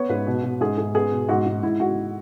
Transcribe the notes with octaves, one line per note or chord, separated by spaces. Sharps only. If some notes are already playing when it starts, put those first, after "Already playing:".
Already playing: B3 C#5
G#2 B4
B2
B2
G#2 G#4
G#2 G#4
B3 G#4
B2
G#2 F#4
G#2
G#2 E4
G#2 F#4